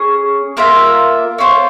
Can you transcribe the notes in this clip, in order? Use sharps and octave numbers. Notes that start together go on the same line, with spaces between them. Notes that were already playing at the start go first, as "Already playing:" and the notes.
Already playing: C#4 G#4
A#3 F4 A#4 E5
C#4 F4 C5